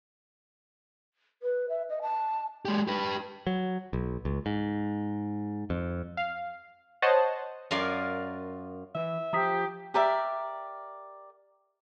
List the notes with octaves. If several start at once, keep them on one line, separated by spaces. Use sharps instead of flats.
B4
E5
D#5
A5
G#3 G4
G4 B4
F#3
B1
C#2
G#2
F2
F5
C5 C#5 D#5 F#5 A5
F#2 F4 A#4 D5 F5 G#5
E3 E5
F3 G4 A#5 D#6 B6
G4 A#4 D5 E5